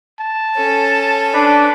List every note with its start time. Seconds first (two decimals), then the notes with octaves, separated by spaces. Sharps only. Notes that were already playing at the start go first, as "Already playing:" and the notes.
0.19 A5
0.55 C#4 A4
1.34 D4 B4